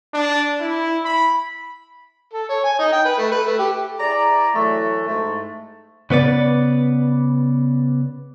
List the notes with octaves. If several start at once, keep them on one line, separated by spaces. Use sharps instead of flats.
D4
E4
B5
A4
C#5
G#5
D#4
G5
B4
A3
B4
A3
G4
E4 G#4 D5 A#5
E3 F#3 A3
G#2 A3
C#3 B3 B4 D5